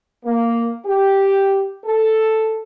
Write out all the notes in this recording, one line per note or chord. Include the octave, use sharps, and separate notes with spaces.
A#3
G4
A4